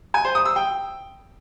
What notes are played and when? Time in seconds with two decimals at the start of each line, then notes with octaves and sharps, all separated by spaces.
0.14 G#5
0.25 C5
0.35 D#6
0.45 E6
0.56 G5